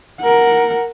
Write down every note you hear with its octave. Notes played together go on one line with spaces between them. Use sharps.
A#4 F#5